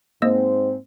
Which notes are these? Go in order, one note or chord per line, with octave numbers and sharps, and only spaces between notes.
G#2 A#3 C4 C5 D#5 E6